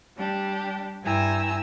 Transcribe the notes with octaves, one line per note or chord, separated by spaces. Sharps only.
G3 D4 G4
G2 E4 G5 G#5 A#5 E6